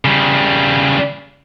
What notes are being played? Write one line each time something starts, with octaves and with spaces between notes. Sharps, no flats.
C#3 G3